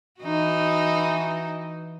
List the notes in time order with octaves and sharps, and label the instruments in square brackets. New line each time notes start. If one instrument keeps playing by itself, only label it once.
[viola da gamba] E3 D#4 F#4